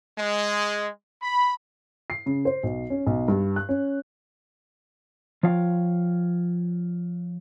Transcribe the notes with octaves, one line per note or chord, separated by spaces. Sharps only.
G#3
B5
C7
C#3
C5
B1
C#4
B1
G2
F#6
C#4
F3 F4 C#5 F5 G5